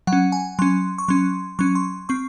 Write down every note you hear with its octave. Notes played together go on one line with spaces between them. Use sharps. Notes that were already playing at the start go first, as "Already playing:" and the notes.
F#3 F#5
C#4
G#5
F#3 C#4 C6
C#6
F#3 C#4 C6
F#3 C#4 C#6
C6
C4 C#6